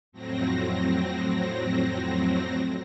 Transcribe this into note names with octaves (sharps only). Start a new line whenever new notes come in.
F2 A2 F#3 C4 A#6